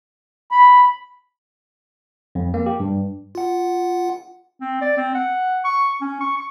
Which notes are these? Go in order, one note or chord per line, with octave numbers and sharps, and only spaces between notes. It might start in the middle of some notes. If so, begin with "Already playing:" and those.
B5
F2
A#3
G4
G2
F4 F#5
C4
D5
C4
F#5
C#6
C#4
C#6
C#6